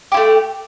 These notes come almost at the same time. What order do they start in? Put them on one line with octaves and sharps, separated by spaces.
G4 E4 A3